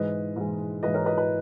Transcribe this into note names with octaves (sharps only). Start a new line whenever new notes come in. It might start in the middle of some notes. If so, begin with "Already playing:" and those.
Already playing: G#2 E3 G#3 B4 D#5
G#2 E3 G#3
G#2 E3 G#3 B4 D#5
A#4 C#5
B4 D#5
B4 D#5